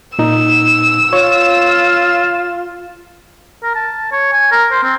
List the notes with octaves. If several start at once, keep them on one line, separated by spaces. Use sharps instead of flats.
A#2 D#4 E6
F4 C#5
A#4
A5
C#5
G#5
A#4
C5
C4